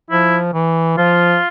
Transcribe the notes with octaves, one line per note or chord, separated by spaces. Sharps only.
F3 E4
E3
F3 F4